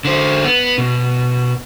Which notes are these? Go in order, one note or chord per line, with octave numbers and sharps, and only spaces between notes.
D3 C5
B3
B2